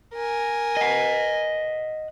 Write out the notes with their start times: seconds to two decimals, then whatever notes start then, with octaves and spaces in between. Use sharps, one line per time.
0.14 A#4 G#5
0.77 D#5 F#5